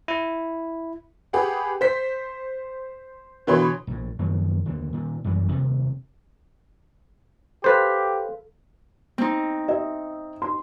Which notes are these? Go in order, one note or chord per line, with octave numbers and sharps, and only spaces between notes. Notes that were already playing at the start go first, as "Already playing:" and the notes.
E4
G4 G#4 B4 F#5
C5 B6
B2 D3 E3 C#5 B5 C6
A#1 A2
F#2 D#3 F3 A#3
D#2 D3
A#2 D#3
A1 F#2 E3 G3
D#1 C3
G4 A4 B4 C5 F5 B6
C4 D#4
D#5 E5
C6